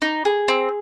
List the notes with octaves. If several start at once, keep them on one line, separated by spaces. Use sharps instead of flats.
D#4
G#4
C4